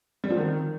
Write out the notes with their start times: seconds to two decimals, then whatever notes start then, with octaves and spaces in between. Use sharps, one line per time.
0.24 G3
0.30 F3
0.37 D#3